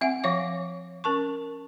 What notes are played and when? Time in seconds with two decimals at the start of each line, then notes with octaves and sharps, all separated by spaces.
0.01 C4 E5 F#5 G#5
0.24 F3 C#5 F5 D6
1.04 C#4 A#4 A5 C#6